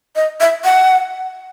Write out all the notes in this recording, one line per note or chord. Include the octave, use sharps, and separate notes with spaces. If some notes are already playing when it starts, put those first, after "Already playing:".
D#5
E5
F#5